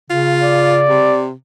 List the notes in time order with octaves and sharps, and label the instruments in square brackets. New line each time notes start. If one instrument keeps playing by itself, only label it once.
[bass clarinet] C#3 [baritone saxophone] F4
[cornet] D5
[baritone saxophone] C3